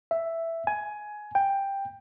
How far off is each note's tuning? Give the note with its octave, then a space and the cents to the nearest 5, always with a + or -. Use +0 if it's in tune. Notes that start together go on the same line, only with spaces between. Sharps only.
E5 +5
G#5 +15
G5 +10